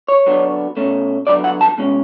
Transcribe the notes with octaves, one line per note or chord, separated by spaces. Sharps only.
C#5
D3 F#3 B3 D4
B2 A3 C#4
D3 F#3 B3 D5
F#5
A5
B2 G#3 C#4